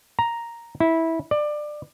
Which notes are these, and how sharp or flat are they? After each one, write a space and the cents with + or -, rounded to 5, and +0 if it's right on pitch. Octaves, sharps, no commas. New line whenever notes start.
A#5 +0
E4 -15
D5 +20